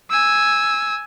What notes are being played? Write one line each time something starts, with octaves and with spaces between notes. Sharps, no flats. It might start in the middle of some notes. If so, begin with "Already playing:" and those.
G#5 E6